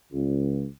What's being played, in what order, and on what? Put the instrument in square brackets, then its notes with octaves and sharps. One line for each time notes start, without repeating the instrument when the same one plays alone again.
[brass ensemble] C#2